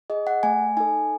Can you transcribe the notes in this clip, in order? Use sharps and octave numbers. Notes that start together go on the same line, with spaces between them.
G#4 D#5
F#5
A3 G#5
D#4 A4 G#5